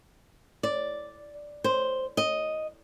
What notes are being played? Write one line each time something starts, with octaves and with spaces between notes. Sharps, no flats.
D5
C5
D#5